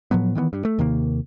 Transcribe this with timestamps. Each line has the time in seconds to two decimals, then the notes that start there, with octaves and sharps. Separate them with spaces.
0.11 A2 F3 F#3 B3
0.35 D#3 E3 A3 B3
0.53 G2
0.65 A3
0.79 D#2 C3 D#3 A#3